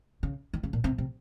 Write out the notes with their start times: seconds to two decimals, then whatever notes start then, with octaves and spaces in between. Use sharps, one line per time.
0.23 C#3
0.53 D#3
0.63 C#3
0.73 A#2
0.84 C3
0.98 C3